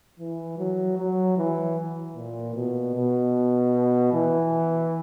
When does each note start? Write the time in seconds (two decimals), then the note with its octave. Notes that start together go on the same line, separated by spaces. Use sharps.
0.20 E3
0.58 F#3
0.98 F#3
1.38 E3
2.16 A#2
2.55 B2
2.95 B2
4.13 E3